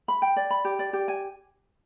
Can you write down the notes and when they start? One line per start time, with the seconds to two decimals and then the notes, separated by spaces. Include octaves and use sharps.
0.08 B5
0.22 G5
0.36 D5
0.50 B5
0.65 G4
0.79 D5
0.93 G4
1.08 G#5